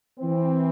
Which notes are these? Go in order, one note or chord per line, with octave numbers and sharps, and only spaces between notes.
E3 C4